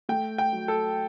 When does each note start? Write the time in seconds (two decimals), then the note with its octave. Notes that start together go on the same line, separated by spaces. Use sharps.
0.09 A3 G5
0.38 G5
0.53 F#3
0.68 A4